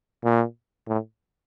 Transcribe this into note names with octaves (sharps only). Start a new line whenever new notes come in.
A#2
A2